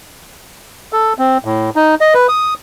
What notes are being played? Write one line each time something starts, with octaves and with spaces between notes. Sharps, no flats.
A4
C4
A2
D#4
D#5
B4
D#6